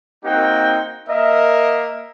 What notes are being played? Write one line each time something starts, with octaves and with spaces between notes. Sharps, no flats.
A#3 C4 D#4 F#4 G5
A#3 A#4 D#5 E5